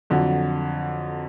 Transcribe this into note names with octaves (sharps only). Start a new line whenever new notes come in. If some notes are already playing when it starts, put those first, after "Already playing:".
F2 D3 F#3